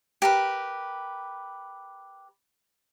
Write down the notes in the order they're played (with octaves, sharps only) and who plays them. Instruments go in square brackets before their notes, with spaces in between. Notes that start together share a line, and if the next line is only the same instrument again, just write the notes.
[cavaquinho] G4 A#4 B4